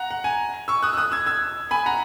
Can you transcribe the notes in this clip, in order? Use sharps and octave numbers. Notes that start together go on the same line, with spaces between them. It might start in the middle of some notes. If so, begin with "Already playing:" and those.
Already playing: F#5 A#5
F#5
G#5
C#6 E6
D#6 F#6
E6
D#6 F#6
E6 G#6
E6 G#6
G#5 B5
F#5 A#5